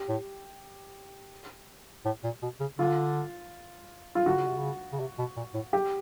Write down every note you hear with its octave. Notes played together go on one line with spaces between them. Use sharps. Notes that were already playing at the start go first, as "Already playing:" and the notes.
Already playing: G4
A2
A2
A#2
B2
C#3
D3 F4
F4
D3 F#4
C#3
C3
C#3
C#3
C3
B2
A#2
A2
G4